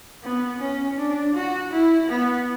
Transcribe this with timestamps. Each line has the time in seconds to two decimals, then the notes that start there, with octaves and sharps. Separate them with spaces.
0.23 B3
0.60 C#4
0.98 D4
1.34 F#4
1.71 E4
2.09 B3